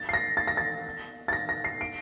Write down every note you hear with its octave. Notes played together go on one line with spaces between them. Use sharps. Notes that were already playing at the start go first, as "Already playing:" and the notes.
Already playing: A6
C7
A#6
A6
A#6
A6
A6
A#6
A#6
C7
D7